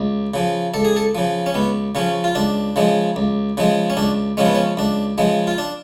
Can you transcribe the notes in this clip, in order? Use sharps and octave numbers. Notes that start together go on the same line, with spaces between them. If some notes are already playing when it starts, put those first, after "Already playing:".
Already playing: C#2
C#3 F3
C#2 A4
G#4
A4
C#3 F3
C#4
C#2 B3
C#3 F3 C#4
F4
C#2 D4
C#3 F3 G#3
C#2
C#3 F3 G#3
C#4
C#2 D4
C#3 F3 G#3 C#4
B3
C#4
C#2 D4
C#3 F3 G#3
F4
D4